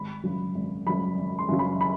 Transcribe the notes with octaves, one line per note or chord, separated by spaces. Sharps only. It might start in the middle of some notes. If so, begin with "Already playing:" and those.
Already playing: G#1 B5
F#2 C#3 F#3
G#1
F#2 C#3 F#3 B5
G#1
C6
F#2 C#3 F#3
B5
B5